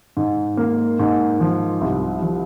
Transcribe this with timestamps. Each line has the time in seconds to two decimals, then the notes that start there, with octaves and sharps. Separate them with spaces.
0.17 G#2
0.57 A#3
0.99 G#2
1.40 F3
1.81 C2
2.22 F3